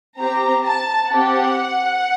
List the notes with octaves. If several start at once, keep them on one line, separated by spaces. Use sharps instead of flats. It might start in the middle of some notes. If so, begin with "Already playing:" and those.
C4 G4 A#5
A5
C4 G4 F#5